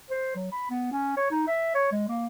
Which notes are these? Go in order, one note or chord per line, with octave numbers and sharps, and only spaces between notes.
C5
F#3
B5
B3
C#4
C#5
D#4
E5
C#5
G#3
A#3